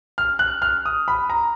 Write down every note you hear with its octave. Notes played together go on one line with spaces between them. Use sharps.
F6
F#6
F6
D#6
B5
A#5